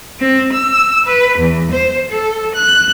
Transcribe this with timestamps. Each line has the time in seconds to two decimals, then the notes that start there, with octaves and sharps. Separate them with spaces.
0.19 C4
0.52 E6
1.06 B4
1.38 E2
1.71 C5
2.10 A4
2.54 F#6